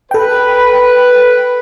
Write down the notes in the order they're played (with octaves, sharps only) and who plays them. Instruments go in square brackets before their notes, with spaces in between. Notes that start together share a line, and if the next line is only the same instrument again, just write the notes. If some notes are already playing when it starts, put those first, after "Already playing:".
[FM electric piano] A4 G5 [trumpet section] B4